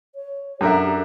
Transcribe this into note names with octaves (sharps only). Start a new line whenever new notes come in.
C#5
F#2 D4 G4 A4 A#4 E5